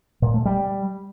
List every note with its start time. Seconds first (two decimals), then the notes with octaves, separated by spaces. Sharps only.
0.22 A#2
0.34 A3
0.45 G3